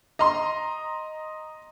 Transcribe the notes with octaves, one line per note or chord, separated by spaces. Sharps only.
D#5 A#5 C6